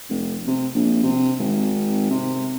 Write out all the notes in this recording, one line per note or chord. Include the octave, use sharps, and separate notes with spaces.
F1
C3
A#1
C3
G#1
C3